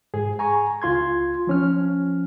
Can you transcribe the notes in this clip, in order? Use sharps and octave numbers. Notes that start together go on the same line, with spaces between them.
G#2 G#4
G#5 A#5 C#6
C#2 F4 C6 G#6
F3 C#4 F6